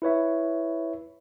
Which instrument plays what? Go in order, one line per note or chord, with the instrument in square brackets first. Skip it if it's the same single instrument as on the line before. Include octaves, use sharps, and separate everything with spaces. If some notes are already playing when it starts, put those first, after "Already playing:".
[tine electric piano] E4 B4 C#5 E5